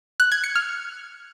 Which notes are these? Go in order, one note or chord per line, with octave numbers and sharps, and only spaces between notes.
F#6
G#6
C#7
F6